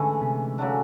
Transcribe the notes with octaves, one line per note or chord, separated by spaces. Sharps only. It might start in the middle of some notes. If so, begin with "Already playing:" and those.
Already playing: G#2 D3 E3 A3 C#4
C3
C#3 F#3 A3 D4